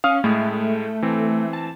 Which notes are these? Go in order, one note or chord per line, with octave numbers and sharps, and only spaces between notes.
C#4 F5 D#6 F6
A2 G#3 A3 E4
E3 C4
A5